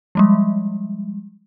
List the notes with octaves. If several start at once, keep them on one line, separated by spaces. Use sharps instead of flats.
F3 G3 G#3